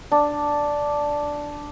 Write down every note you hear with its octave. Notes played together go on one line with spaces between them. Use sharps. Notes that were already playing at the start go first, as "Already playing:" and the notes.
D4